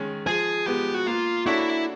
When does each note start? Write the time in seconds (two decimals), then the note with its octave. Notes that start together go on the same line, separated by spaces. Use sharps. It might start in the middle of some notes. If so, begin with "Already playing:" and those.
Already playing: D#3 G#3 C#4
0.26 F3 G#4
0.66 G#3 B3 G4
0.94 F#4
1.06 A#3 F4
1.46 D4 E4 F#4 A4 C#5